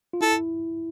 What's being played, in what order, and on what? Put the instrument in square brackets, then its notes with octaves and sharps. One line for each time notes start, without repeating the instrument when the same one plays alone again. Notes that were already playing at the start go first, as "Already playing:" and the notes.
[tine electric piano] F4
[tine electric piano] E4 [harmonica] A4